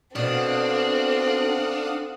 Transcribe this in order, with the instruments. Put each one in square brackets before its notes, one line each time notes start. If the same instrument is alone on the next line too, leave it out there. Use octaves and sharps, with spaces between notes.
[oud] B2 [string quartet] C4 A4 [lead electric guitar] D4 [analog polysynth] F5 F#5 D#6